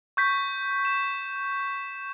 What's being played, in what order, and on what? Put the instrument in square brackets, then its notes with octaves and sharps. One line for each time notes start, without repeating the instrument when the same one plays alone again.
[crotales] C#6 G6 B6
E7